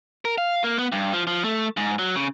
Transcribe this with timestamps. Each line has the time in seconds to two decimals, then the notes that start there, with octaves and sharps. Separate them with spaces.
0.25 A#4
0.38 F5
0.64 A#3
0.79 B3
0.92 G2
1.13 F3
1.27 F3
1.44 A3
1.77 G#2
1.99 F#3
2.16 C#3